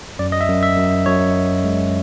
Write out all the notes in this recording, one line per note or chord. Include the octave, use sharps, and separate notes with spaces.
F#2 D5
D#5
E5
F#2
E5
F#2
F#2 C#5
F#2
G#3